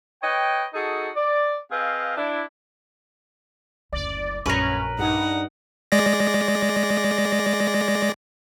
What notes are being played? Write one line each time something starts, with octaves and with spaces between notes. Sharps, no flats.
B4 C#5 D#5 G5
D#4 F#4 G#4 A4
D5
C4 G#4 B4 D#5 F5
D4 E4
F#1 D2 D5
A#1 F#2 A3 C#4 A#4 B4
G2 D#4 F#5
G#3 D5 A#6